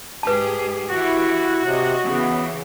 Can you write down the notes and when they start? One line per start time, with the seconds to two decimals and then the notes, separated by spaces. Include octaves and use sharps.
0.23 G#2 G4 G#4 B4 A5
0.90 E3 E4 F#4 G4
1.65 C3 C#5 D#5
2.05 C#3 E3 B3